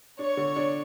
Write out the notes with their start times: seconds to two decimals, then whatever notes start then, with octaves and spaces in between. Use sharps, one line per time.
0.19 D4 C#5
0.37 D3
0.56 D4